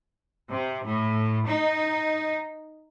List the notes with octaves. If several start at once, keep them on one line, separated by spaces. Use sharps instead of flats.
C3
A2
D#4